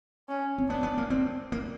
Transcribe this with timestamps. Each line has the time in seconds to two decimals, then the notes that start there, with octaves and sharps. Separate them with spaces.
0.29 C#4
0.58 C4
0.69 B3 D4
0.83 B3
0.98 A#3
1.10 C4
1.52 A#3